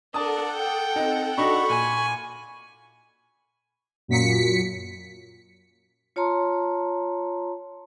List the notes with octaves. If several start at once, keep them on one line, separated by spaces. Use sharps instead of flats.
D4 A4 A#4 D5 F#5 A5 D#6
G5
C4 D#4
D4 D#4 F#4 B5 C#6
A#2 G#5
F#2 A#2 B6 C#7
F4 C#5 A5 A#5 C6